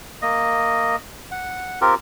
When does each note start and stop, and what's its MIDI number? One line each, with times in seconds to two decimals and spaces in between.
0.22 0.96 58
0.22 0.96 75
1.32 1.79 78
1.81 1.95 60
1.81 1.95 65
1.81 1.95 67
1.81 1.95 70